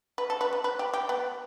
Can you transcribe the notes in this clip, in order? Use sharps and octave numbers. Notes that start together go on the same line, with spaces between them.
B4
A4
B4
B4
B4
G4
G4
B3